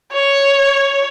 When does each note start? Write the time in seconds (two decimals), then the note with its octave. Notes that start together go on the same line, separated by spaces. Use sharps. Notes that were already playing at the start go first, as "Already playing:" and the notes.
0.13 C#5